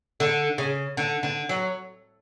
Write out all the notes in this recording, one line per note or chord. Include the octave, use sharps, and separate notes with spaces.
D3
C#3
D3
D3
F#3